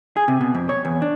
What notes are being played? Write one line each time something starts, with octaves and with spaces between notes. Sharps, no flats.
G#4
C3
B2
F2
C#5
E2
D4